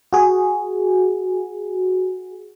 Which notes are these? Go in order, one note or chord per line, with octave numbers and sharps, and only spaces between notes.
F#4 G#4